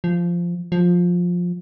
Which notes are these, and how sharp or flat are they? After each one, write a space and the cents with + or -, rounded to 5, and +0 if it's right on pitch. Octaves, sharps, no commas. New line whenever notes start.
F3 -10
F3 +15